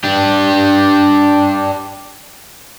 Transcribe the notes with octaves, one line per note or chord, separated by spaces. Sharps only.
D4 G4